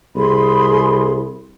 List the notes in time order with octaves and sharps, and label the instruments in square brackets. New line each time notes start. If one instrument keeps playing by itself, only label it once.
[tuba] C2 [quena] G#4 [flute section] B5 C6